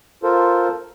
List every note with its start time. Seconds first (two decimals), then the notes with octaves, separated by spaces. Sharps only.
0.23 F4 A4 A#4 C5